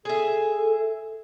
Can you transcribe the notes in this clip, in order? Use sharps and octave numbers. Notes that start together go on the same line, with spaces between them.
G#4 A4 E5